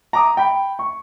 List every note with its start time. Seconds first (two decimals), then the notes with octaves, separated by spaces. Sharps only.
0.13 A#5 D6 D#6
0.37 G5 B5
0.79 C#6